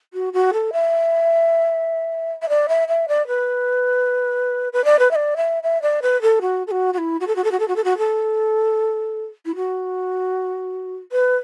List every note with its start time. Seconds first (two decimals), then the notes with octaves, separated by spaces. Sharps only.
0.13 F#4
0.33 F#4
0.53 A4
0.73 E5
2.42 E5
2.49 D5
2.68 E5
2.88 E5
3.08 D5
3.27 B4
4.73 B4
4.84 D5
4.99 B4
5.11 E5
5.15 D5
5.36 E5
5.63 E5
5.82 D5
6.02 B4
6.22 A4
6.41 F#4
6.67 A4
6.71 F#4
6.93 F#4
6.98 E4
7.20 F#4
7.27 A4
7.36 F#4
7.44 A4
7.51 F#4
7.59 A4
7.68 F#4
7.76 A4
7.84 F#4
7.98 A4
9.45 E4
9.55 F#4
11.12 B4